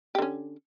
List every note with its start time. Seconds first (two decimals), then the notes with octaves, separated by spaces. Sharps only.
0.15 G4
0.18 D3
0.22 C#4